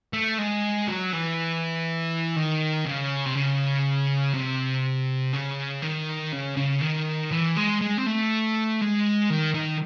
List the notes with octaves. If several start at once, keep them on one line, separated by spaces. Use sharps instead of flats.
A3
G#3
F#3
E3
D#3
C#3
C3
C#3
C3
C#3
D#3
C#3
C#3
D#3
E3
G#3
G#3
C4
A3
G#3
D#3
D#3